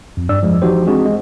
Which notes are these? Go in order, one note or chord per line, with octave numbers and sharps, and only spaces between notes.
F2
G2 D4 D5 E6
F3 G#3
E3 F3 D#4 F#4 G4 C5
G#3 C4 D4 F#4 G#4
G#3